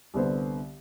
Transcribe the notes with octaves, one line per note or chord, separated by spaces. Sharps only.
C2 D3 B3 C5